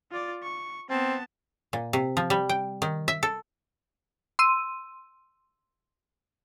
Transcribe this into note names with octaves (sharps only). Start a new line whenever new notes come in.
F4 D5
C#6
B3 C4 A5
A#2
C3
F3
G3
G5
D#3
E5
A4
C6 E6 D#7